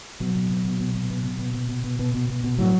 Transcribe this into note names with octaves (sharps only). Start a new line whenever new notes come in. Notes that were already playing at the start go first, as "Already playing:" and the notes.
B2 F#3
B2
B2
B2
B2
B2
B2
B2
B2
B2
B2
B2
B2
B2
B2
B2
A2 F#3